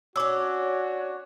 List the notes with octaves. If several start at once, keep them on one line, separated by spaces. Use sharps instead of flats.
C#4 D4 F#4 C#5 D6 E6